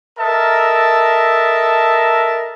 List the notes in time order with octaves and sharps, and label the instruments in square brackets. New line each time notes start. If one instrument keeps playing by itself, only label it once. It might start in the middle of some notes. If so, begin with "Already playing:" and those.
[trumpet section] A4 A#4 D#5 E5 A5